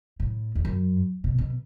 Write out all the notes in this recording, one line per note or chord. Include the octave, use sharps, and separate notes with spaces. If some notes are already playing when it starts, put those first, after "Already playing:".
A2
E2
F#2
B2
B2